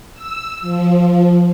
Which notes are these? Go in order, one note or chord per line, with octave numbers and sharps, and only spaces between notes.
E6
F3